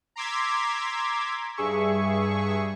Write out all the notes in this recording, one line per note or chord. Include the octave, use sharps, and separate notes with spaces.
A#5 C6 D6 E6 G#6 B6
G2 G#4 E5 C#6